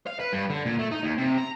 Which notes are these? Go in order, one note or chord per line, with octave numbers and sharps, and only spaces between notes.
F5
B4
G2
D3
A#2
A3
D#4
D#2
C3
A#5